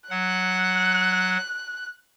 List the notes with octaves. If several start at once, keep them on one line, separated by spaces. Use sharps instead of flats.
F#3 F#5 F#6